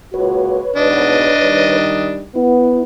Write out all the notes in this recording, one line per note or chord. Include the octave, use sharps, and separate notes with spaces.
C#2 A#2 F#4 B4 C#5
G#2 B2 D4 D#5
D#3 G3
B3 E4